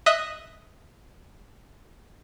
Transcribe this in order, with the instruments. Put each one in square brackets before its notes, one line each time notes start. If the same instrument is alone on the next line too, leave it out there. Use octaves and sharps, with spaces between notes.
[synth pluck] D#5 E5 D#6 F#6